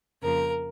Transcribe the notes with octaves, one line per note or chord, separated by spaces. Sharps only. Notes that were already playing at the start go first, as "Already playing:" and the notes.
F2 C#3 F3 A#3 A#4